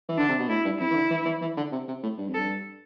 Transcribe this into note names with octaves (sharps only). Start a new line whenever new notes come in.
E3
D3 D4
C3
B2
A2 E4
G2
F2 E4
E3
D3
E3
E3
E3
D3
C3
C3
A2
G2
F2
G2 A4